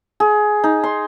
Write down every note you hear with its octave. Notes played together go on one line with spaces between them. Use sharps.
G#4
D#4
C6